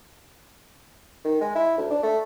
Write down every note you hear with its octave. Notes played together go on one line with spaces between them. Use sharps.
D#3
G#3
E4
D2
D4
A3